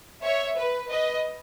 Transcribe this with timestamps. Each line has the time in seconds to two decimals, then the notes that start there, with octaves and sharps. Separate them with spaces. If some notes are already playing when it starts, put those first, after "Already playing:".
0.22 C#5 E5
0.57 B4
0.90 B4 D#5